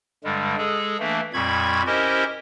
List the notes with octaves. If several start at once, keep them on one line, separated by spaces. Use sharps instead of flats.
G2 D3 G3 G#3
G#3 G#4 A4
E3 A3 A#3 D4
F2 A#2 G3 B5 C#6 G#6
C#4 E4 G4 A#4 C5 D#5